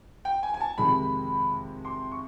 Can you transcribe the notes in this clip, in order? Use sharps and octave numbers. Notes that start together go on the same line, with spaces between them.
G5
G#5
G#5
A5
F2 C3 D#3 G#3 B5
C6
C#6